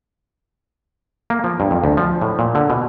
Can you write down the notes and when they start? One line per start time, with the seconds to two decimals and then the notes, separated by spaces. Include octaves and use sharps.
1.30 A#3
1.44 F3
1.60 G2
1.71 F2
1.84 D2
1.97 F3
2.21 A2
2.39 A#2
2.55 D3
2.70 B2